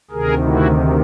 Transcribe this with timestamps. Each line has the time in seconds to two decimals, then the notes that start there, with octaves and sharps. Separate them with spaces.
0.11 D2 C3 D#3 G#4 A#4
0.44 E4 F#4